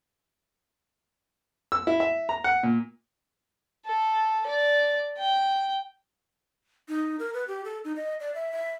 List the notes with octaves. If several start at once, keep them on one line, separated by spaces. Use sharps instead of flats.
E6
E4
E5
A#5
F#5
A#2
A4
D5
G5
D#4
A#4
B4
G4
A4
D#4
D#5
D5
E5
E5